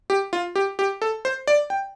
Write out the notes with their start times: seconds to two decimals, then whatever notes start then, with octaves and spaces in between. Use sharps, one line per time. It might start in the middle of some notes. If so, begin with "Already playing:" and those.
0.10 G4
0.33 F4
0.56 G4
0.79 G4
1.02 A4
1.25 C5
1.47 D5
1.70 G5